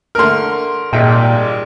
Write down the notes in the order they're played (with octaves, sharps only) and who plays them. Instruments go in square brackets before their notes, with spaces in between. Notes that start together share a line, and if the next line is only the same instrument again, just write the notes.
[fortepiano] D3 A3 F6 [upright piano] A#4 C6
[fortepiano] G#1 G5 [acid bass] A#2 [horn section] G3 G#3